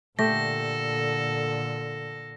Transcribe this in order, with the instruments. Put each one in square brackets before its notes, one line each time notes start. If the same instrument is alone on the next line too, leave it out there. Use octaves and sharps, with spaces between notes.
[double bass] A#2 D3 [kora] A3 G4 [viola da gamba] A4 [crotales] A#6